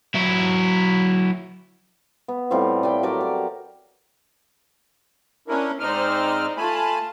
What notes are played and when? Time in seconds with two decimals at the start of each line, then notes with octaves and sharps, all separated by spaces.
0.15 F#3 E4
2.28 B3
2.50 A2 G3 C4 F4
2.83 D5 F#5 G5 B5
3.03 F#3 G4 A#4 D5
3.21 D6
5.48 C#4 D4 E4 A#4
5.80 G#2 C4 D#4 C5 D5 F6
6.57 A3 F4 G#5 A5 B5